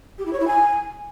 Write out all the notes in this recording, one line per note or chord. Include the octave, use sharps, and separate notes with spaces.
G4
E4
C#5
E4
G#5